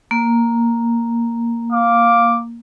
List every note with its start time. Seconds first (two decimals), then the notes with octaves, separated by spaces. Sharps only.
0.11 A#3
1.71 F5 D6